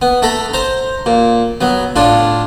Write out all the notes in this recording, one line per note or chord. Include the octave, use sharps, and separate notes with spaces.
B3
A3 A4 A#5 B5
C5 A#5
A#2
F#3 B3
A2 D4 F4